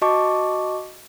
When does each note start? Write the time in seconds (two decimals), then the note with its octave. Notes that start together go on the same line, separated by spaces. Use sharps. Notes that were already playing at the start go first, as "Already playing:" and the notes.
0.02 F#4 D#5 A5 C#6 D6